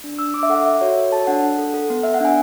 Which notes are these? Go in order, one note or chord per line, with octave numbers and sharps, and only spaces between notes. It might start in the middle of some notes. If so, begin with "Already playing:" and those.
D4
D4 E6
D4 D6
E5
A4 F#5
A4 E5
F#4 C#5
F#4 C#5
A4 A5
D4 F#5
D4
A4
A4
B3
B3 E5
F#5
D4 G#5